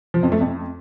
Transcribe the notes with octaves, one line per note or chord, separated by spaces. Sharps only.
F3
F2
A3
F2